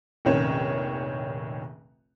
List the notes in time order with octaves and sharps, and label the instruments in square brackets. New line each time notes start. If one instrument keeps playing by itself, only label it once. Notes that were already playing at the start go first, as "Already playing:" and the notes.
[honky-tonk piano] F1 A#1 D#3 C#4 C#5